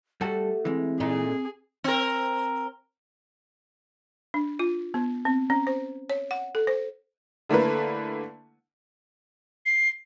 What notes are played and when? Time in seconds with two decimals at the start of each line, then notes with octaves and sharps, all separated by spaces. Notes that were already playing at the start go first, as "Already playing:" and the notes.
0.21 G3 A3 F#4 G4 A4
0.65 E3 G#3 C4
1.00 A#2 A3 D#4 G#4
1.84 C4 A#4
4.34 D4
4.59 F4
4.94 B3
5.25 C4
5.50 C#4
5.67 C5
6.10 C#5
6.31 F#5
6.55 A4
6.67 C5
7.49 D3 A3 A#3 E4 B4
9.66 C7